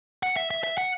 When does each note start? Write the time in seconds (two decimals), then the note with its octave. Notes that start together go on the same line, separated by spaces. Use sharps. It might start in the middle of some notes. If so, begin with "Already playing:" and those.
0.23 F#5
0.37 E5
0.51 E5
0.64 E5
0.78 F#5